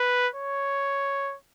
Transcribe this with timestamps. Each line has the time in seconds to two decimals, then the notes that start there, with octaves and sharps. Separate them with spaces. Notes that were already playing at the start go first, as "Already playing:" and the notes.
Already playing: B4
0.35 C#5